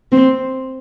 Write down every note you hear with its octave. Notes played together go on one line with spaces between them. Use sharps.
C4